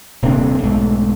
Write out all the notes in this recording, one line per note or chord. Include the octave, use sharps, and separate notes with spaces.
D#1 C3 A#3 D4
B1 G#2 A3